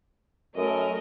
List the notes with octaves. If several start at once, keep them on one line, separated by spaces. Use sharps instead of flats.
F#2 A3 A#4 D#5